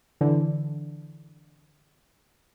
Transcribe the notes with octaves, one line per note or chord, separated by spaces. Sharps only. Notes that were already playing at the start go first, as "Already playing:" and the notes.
D3 E3